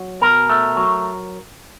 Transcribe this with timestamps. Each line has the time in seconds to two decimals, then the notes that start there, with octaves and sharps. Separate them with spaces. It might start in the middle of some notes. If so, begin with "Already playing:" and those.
Already playing: F#3
0.21 B2 A#4
0.49 A3
0.77 F#3